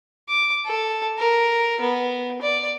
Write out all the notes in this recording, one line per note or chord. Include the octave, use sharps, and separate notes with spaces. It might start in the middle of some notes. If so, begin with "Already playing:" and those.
D6
A4
A#4
B3
D5